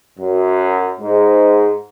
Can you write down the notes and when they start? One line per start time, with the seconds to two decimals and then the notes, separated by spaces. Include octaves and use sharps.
0.19 F#2
0.99 G#2